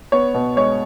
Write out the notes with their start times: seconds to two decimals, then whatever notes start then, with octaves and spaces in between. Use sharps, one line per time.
0.12 B3 C#5
0.34 B2
0.56 G#3 C#5